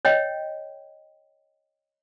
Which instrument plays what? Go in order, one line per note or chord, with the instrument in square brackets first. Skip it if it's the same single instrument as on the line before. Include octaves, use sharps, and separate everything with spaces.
[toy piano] C#5 D#5 G5